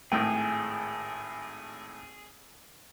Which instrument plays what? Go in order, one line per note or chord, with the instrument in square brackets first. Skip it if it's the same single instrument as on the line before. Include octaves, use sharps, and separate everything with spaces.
[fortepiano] G#1 A2 G5 [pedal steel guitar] G#4